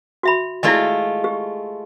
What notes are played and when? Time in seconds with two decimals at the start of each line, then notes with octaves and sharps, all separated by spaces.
0.23 F#4 E5 B5
0.63 G#3 A3 E4 F4 D5 D#5
1.24 G4